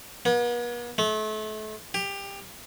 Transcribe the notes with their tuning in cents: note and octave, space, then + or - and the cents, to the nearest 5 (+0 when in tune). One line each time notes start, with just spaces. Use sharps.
B3 -45
A3 -35
G4 +20